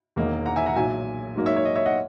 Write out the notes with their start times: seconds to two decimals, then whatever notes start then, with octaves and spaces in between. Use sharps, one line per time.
0.16 E1 E2 D#3 A#3 D#4
0.46 F#5 A#5
0.56 E5 G#5
0.66 F#5 A#5
0.76 B1 A#2 F#3 E5 G#5
1.36 G#2 F#3 A#3 D#4
1.46 C#5 E5
1.56 C#5
1.65 D#5
1.76 C#5 E5
1.85 D#5 F#5